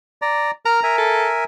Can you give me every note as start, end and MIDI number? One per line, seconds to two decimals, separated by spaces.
0.22 0.51 74
0.22 0.51 82
0.66 0.80 70
0.66 0.93 82
0.66 0.80 89
0.83 1.44 70
0.83 1.44 76
0.83 1.44 80
0.98 1.29 69